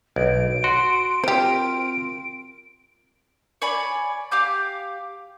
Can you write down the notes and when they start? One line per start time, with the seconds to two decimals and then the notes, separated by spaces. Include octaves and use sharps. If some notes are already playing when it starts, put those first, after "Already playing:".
0.16 B1 D7
0.64 F#4 C6
1.24 C4 F4 G4 A#4 C5
3.62 C#5 D5 G#5 B5
4.31 G4 F5 D6 G6